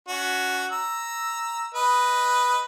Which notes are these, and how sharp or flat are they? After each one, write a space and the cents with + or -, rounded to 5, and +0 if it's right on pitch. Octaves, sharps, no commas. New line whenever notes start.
C#4 +30 F#4 +0
A#5 +0 E6 +0
B4 +0 D#5 +0